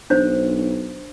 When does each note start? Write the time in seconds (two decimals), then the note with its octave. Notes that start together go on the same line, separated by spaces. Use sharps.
0.10 B1 D4 C5